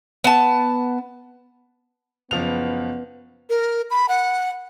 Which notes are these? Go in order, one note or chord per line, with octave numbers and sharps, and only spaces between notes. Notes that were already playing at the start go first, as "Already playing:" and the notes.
B3 A5
F#1 F3 B3 F7
A#4
B5
F#5